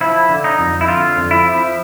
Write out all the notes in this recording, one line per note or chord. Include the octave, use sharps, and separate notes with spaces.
F3 E4
D3
D#4
F2
E4
D3 F4
F2
E4
F3